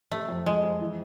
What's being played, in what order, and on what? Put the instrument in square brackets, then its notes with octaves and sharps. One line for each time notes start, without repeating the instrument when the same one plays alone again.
[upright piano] C3 [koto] A3
[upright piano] F2
[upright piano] F3 [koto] G#3
[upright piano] F2
E3